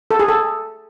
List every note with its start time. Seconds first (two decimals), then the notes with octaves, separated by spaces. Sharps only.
0.11 A4
0.19 G#4
0.28 A4